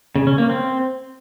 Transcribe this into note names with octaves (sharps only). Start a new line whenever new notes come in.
C#3
C#4
A#3
C4